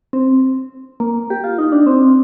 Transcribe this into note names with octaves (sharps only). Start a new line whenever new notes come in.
C4
A#3
G4
F4
D#4
D4
C4